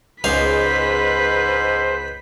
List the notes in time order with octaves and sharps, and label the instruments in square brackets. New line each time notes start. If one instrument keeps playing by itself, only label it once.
[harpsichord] C#2 G#4 F5 [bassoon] G#2 [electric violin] B4 B6 [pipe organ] C5